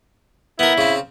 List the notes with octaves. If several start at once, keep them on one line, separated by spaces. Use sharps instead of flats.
B3 E4 A#4
C#3 C4